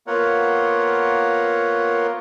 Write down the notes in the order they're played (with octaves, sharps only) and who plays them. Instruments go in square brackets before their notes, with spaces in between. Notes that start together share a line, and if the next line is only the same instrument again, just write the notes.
[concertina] A#3 B3 F4 A#4 C#5 F#5